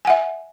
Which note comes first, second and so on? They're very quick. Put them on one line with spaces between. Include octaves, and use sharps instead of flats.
G#5 F#5 E5